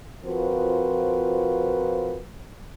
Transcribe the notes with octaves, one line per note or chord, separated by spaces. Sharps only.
F3 C4 F4 F#4 A#4 B4